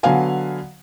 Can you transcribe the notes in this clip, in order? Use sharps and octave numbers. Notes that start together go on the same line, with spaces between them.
D3 F#3 B3 F5 G#5